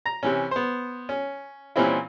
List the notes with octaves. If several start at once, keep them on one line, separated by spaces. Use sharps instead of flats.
A#5
C3 E3 C#4
B3 C5
C#4
A#2 E3 G3 C4 C#4 E4